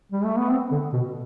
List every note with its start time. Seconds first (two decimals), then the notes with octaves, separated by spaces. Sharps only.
0.12 G3
0.24 A3
0.38 B3
0.51 C4
0.71 D3
0.93 B2